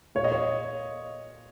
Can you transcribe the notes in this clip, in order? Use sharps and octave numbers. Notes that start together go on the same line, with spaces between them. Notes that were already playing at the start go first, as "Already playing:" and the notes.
A#2 C#5
D#5
C#5